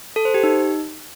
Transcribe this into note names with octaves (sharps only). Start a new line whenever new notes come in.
A4
C5
G4
D#4